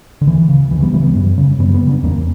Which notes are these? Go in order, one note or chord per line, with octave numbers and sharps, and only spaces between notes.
D3
D2 E3
C#3
D2 E3
G3 B3
C#3 E3 G3
G3 B3
F#2
C#3
F#2 G3 B3
G3 B3
C#3
B3 D4
E2 A#3 C#4